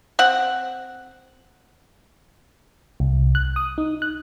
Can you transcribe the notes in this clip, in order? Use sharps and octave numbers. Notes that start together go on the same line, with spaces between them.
C4 F#5
C2
F#6
D#6
D#4
F#6